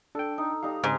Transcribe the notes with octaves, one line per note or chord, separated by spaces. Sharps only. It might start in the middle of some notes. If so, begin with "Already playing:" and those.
D4 A4 G5
D#4
G3 D#4 F5 A#5
G#2 C#3 C4 F5 C6